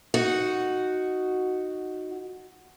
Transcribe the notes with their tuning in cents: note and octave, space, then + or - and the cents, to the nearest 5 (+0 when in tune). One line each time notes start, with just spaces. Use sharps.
D#4 +0 F#4 +0